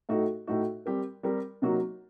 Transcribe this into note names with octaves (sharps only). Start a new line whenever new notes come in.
A2 A3 D#4 F#4
A2 A3 D#4 F#4
G3 C4 G4 A#4
G3 C4 G4 A#4
C3 F#3 A#3 D#4 F#4